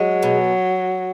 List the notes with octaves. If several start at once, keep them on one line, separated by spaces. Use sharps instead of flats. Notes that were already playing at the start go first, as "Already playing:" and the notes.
Already playing: F#3 G#3
B2